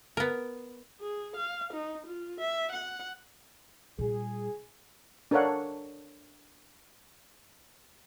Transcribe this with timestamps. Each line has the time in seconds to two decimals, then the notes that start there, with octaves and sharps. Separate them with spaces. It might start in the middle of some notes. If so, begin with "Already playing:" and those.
0.17 B3 A#4
1.00 G#4
1.37 F5
1.73 D#4
2.06 F4
2.40 E5
2.72 F#5
3.99 A#2 G3 G#4
5.31 D4 A4 A#4 C#5 F5 F#5